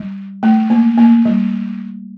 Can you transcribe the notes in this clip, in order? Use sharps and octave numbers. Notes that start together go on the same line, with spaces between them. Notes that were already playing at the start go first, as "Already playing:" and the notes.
Already playing: G3
A3
A#3
A#3
G3